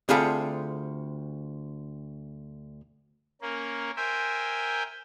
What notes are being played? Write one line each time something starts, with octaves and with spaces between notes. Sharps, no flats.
D2 C4 F4 G#4 A4 B5
A#3 C#4 A#4
A#4 C5 E5 G5 G#5